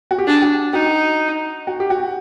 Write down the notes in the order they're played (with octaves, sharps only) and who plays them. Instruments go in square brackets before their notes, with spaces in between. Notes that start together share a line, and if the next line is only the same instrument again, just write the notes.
[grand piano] F#4
G4
[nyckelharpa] D4 [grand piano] G#4
[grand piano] F#4
[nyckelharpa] D#4 [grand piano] F#4
[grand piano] F#4
G4
F#4